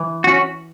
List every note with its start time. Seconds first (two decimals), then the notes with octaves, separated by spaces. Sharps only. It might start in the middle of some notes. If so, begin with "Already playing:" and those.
Already playing: E3
0.24 C#4 F#4